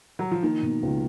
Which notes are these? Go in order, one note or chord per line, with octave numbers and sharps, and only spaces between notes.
F#3
F3
D#3 A#3
B2
C#2